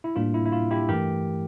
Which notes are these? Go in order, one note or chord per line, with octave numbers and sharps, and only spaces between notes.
E4
A2 G3 A#3 D4 F4
E4
E4
F4
E4 G4
G2 E3 A3 G4 A#4